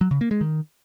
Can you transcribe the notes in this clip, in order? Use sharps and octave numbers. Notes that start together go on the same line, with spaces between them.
F#3
C#3
A#3
G#3
D#3